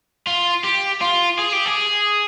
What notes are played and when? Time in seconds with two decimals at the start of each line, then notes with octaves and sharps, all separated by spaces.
0.27 F4
0.64 G4
1.01 F4
1.39 G#4
1.53 G4
1.66 G#4